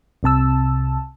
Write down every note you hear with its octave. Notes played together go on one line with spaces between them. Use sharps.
C2 C3 A5 E6